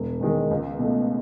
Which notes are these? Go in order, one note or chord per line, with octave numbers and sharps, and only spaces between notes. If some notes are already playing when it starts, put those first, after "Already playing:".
Already playing: E1
E2 D#3 G#3
C#2
B2 A3